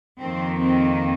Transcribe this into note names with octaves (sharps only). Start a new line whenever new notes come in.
F2 D#3 A#3 C4
C4